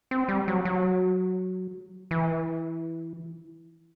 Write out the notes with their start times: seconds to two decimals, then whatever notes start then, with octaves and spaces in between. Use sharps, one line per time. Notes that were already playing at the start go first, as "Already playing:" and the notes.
0.11 C4
0.28 G3
0.48 F#3
0.65 F#3
2.11 E3